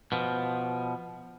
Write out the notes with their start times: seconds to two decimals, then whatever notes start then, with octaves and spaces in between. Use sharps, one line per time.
0.12 B2 F3